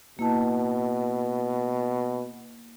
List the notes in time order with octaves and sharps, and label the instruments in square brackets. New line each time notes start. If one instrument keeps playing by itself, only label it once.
[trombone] B2 [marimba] A#3 E4 A5